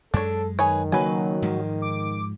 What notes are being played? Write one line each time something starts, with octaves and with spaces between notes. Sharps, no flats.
F#2 G#3 D4 A4 C#5
D#3 G#4 B4 C#5
C#3 F#3 A#3 B4 G#5
G#2 F3 G#3
D6